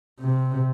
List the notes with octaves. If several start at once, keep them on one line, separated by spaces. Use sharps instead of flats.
C3